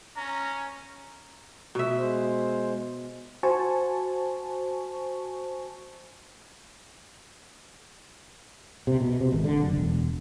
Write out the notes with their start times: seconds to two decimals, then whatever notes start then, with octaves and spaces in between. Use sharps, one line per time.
0.17 C#4 A#5
1.75 B2 E5
1.98 G#3 C5
3.43 F#4 C5 G#5 A5 C#6
8.87 C3
9.01 B2
9.20 C3
9.33 G#1
9.44 D3
9.62 F#1
9.77 E1